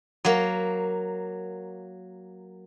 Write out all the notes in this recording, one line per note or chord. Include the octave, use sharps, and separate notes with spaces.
F#3 A#3